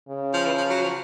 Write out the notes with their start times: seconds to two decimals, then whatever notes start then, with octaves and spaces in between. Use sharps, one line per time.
0.09 C#3
0.34 F3
0.46 E3
0.58 F3
0.70 F#3
0.82 F3